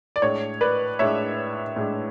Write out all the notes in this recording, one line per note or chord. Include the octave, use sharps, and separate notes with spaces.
D5
A2 G#3 D4 C#5
B4 D5
A2 G#3 D4 C#5 E5
A2 G#3 D4